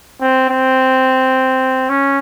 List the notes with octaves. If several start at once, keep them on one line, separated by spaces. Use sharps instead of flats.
C4
C4
C#4